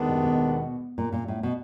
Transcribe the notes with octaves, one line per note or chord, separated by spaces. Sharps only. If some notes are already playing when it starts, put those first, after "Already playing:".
Already playing: D#2 D#3 G#3 B3 D4
B2
C3
B2
A#2
A#2
A2
B2